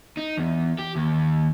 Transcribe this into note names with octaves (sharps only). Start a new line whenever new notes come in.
D#4
E2
G4
D#2